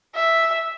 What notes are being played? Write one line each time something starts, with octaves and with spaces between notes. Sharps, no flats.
E5